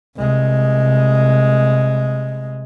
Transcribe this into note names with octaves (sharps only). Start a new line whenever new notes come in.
C2 G#3